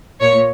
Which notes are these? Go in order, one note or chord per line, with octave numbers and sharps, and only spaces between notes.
A#2 C#5